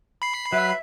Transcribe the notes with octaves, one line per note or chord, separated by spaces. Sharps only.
B5 C7
F#3 B4 E5